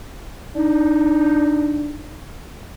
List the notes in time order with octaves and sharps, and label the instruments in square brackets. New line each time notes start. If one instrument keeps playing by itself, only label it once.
[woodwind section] D4 D#4